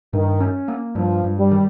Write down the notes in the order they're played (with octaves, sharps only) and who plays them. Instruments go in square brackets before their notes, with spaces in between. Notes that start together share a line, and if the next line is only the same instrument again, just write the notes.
[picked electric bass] G2 [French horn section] D#3
[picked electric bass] C#4
A#3
[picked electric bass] G2 [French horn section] F3
[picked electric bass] G2
[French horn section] G3
[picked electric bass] D#3